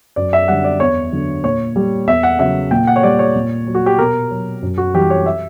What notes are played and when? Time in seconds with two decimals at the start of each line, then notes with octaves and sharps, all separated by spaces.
0.16 F#2 D5
0.33 E5
0.48 D3 G3 F#5
0.64 D5
0.80 E2 C#5
1.12 D3 F#3
1.44 A#2 C#5
1.76 G3
2.07 E2 E5
2.23 F#5
2.39 C#3 F#3 E5
2.71 A#2 G5
2.87 F#5
2.96 C#5
3.03 G3 D5
3.19 C#5
3.35 A#2
3.67 F#3
3.75 F#4
3.86 G4
3.99 B2 A#4
4.31 F#3
4.62 F#2
4.78 F#4
4.94 E3 G3 G4
5.10 C#5
5.26 E5